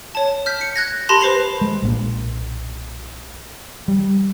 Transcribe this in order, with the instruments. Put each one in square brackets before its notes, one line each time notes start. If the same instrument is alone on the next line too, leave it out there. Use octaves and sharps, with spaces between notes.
[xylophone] C#5 A5
F6 G6 B6
C#7
F#6 G#6 A#6
G4 A#4 A5 B5 C6 A#6
B4 C5 C7 F7
[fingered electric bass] G#3
B1 A#2
G3